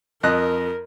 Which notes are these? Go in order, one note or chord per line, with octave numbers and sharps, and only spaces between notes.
F2 A#4 D#5 F#6